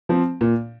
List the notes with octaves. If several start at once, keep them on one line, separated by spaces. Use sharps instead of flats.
F3 C4
A#2